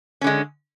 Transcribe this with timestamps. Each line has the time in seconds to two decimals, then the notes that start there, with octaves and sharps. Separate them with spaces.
0.21 C#4
0.24 D3
0.27 G#3